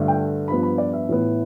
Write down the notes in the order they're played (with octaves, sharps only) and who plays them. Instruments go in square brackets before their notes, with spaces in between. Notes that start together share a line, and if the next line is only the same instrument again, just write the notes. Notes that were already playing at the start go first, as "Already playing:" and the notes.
Already playing: [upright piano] G2 D3 A3
G5
G2 F3 B3 B5
B5
D5
E5
A2 E3 B3